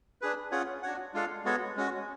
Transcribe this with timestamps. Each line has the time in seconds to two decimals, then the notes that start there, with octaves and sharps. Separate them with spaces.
0.21 D4 G#4 B4
0.51 C#4 F4 G#4 C#5 F#5
0.83 D4 F#4 C#5 F#5
1.14 G#3 D4 F4 A4 F5
1.44 G#3 B3 F#4 A4 C#5
1.76 G#3 C#4 F#4